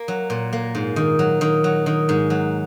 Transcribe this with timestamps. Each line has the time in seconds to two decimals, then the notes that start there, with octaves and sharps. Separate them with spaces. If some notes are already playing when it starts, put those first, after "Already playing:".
Already playing: A#3
0.08 F#3
0.30 A#2
0.53 A#3
0.75 G#2
0.96 D#3
1.19 F#3
1.41 D#3
1.64 F#3
1.86 D#3
2.09 G#2
2.30 F#3